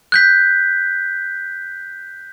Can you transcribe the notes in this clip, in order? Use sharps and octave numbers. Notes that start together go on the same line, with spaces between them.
F#6 G6 B6